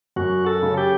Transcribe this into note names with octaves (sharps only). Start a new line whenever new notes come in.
F#2 F#4
A4
C#3
G4